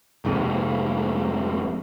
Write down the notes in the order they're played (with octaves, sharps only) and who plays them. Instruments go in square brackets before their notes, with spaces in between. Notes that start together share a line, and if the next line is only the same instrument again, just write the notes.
[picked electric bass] F1 G#2 C3